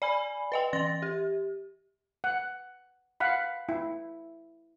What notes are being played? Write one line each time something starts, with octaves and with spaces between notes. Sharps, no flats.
D5 G#5 B5
B4 D#5 G5
E3 C6 A6 A#6
G4
F#5
F5 F#5 B5
E4